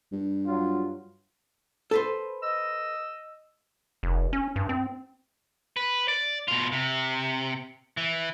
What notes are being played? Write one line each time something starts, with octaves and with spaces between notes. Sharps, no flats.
G2
F#3 F4
A4 B4 C5
D#5 E6
F1
C#4
G2
C4
B4
D5
B2 F4
C3
E3